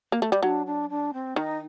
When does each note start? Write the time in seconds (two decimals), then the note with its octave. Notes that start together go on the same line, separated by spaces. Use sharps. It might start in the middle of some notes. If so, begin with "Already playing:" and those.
0.12 A#3
0.22 A3
0.32 G3
0.42 F#3 D4 D#4
0.66 D4
0.89 D4
1.13 C4
1.36 D#3 D#4